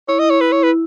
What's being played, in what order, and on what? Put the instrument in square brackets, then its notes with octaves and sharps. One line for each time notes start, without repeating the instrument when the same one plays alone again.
[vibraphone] E4 [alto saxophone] C#5
[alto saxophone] D#5
C#5
[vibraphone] E4 [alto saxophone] B4
[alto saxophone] C#5
B4